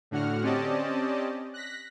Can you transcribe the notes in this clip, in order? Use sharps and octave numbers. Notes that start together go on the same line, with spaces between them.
A2 D3 F#4 F#5 F6
C4 C#4 G4 D5 D#5 A5
F#6 A#6 B6